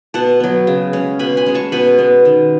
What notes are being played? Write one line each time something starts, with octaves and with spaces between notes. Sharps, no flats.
B2 F#5 A5
F#3 B3
C#3
G#3 C#4
B2 G#5 B5
G#5 B5
G#3 C#4
A5 C#6
B2 G#5 B5
G#3 B3
D#3